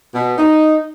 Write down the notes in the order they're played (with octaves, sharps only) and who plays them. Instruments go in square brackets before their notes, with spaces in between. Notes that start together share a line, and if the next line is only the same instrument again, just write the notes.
[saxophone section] B2
D#4